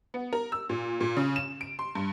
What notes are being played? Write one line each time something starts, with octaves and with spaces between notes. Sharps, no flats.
B3
A#4
E6
A#2
A#2
C#3
E7
D7
C6
G2